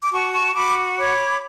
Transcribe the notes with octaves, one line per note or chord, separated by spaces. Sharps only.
D6
F#4 A5 C#6
A5 C#6
C#6
F#4 B5 D6
C#5 B5 D6